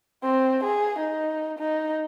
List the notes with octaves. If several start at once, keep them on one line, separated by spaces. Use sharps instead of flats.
C4
G#4
D#4
D#4